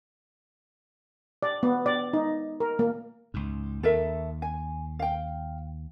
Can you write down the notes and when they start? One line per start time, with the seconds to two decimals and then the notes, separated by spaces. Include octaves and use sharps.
1.43 D5
1.63 B3
1.86 D5
2.13 D#4
2.60 A#4
2.79 A#3
3.34 C#2 G#2
3.83 D#2 A4 A#4 E5
4.42 G#5
4.99 F5 G5